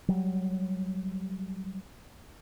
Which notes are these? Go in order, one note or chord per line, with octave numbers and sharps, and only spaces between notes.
F#3 G3